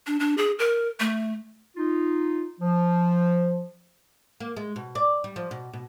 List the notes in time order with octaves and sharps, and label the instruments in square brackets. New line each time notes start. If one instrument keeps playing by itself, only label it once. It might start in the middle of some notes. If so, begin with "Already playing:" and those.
[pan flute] D4
D4
G#4
A#4
A3
[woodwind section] D#4 F4
F3
[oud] A#3
G#3
B2
D5
G3
F3
B2
B2